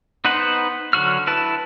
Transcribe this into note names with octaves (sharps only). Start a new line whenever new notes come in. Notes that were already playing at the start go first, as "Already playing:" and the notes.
B3 D#4 B4 C5 F#5
D3 F#3 F#4 F6
E4 B4 A5